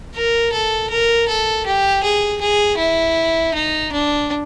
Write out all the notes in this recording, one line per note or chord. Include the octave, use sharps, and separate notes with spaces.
A#4
A4
A#4
A4
G4
G#4
G#4
E4
D#4
D4